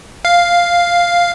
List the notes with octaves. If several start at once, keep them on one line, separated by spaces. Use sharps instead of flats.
F5